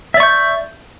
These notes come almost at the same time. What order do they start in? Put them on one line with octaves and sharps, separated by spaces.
E5 D5 C#6 G6